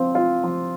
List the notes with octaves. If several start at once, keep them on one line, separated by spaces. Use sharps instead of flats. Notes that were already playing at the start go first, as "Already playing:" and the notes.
Already playing: F3 C4
F4
F3